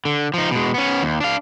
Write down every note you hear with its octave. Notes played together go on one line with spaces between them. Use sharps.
D3
F3 D#4
B2 G#3
B3 C#4
D#2
D4 F5